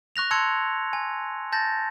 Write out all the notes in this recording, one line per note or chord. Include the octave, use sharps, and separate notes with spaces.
C#6 F#6 A#6 F7
A5 C6 E6 G#6 C#7
G#5
A5 G6 A6 A#6